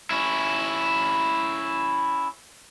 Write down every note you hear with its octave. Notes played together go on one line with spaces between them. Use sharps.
C#4 E4